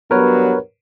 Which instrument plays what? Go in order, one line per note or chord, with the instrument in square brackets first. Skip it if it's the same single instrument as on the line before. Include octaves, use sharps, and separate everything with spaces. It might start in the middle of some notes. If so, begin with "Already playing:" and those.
[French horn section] G2 F#3 B3 [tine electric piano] A#4 B4 C#5